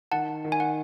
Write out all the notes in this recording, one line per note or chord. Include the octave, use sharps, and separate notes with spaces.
D#3 F#5 A5
D#3
G#5
F#5